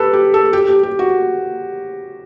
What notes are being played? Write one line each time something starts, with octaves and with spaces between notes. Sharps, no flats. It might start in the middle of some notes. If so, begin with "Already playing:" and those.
Already playing: G4 A4 B4
G4
A4
G4
G4
G4
F#4